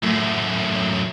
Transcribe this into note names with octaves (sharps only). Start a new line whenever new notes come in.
F#2 A2 A3